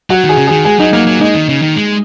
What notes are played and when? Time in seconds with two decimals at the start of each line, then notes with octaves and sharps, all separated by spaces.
0.10 F#3 F#4
0.24 D#3
0.29 G#4
0.37 C#3
0.47 D#3 G#4
0.65 G#3 G#4
0.79 F#3 D#4
0.93 F#3 A#3
1.07 F#3
1.21 G#3 D#4
1.35 D#3
1.49 C#3
1.62 D#3
1.76 G#3